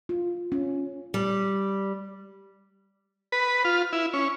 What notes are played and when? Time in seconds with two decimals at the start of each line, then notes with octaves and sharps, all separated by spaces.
0.09 F4
0.52 C#4
1.14 G3
3.32 B4
3.65 F4
3.93 E4
4.13 C#4